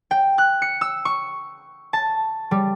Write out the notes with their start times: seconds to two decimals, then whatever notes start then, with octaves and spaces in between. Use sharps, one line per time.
0.11 G5
0.38 F#6
0.62 C#7
0.81 E6
1.05 C#6
1.93 A5
2.51 G3